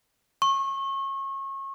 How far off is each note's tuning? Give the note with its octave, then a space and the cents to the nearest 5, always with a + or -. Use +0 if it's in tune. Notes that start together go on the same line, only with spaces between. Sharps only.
C#6 -30